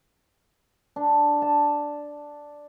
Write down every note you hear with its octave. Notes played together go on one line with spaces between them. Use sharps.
D4
A5